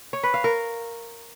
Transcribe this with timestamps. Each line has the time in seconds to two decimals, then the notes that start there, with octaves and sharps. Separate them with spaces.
0.13 C#5
0.23 B4
0.34 F5
0.44 A#4